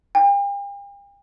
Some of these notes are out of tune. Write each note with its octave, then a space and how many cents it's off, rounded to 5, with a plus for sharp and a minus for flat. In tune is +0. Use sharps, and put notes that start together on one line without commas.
G5 +45